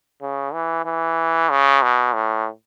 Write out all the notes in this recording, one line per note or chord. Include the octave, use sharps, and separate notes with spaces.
C#3
E3
E3
C#3
B2
A2